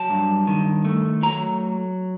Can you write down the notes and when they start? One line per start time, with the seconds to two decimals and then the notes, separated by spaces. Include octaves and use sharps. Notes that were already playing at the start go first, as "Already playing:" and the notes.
Already playing: F#3 A5
0.10 G2
0.47 D#3
0.85 A3
1.23 F#3 A#5